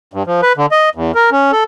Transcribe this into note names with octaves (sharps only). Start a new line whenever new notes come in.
G2
F3
B4
D3
D#5
E2
A#4
C#4
A4